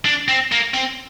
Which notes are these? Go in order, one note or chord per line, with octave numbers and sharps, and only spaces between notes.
D4
C4
A#3
C4